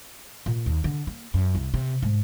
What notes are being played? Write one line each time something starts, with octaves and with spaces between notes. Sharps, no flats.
A#2
D#2
D3
A#3
F#2
C2
C3
G#2